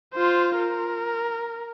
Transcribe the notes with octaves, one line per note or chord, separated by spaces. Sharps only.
F4 C5
A#4